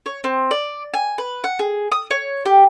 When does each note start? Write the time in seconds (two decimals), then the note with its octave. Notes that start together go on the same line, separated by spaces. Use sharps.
0.06 C#5
0.24 C4
0.51 D5
0.94 G#5
1.18 B4
1.44 F#5
1.59 G#4
1.92 D#6
2.11 C#5
2.46 G4